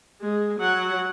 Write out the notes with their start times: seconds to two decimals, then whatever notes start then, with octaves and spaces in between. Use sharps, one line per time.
0.22 G#3
0.59 F#3 F#5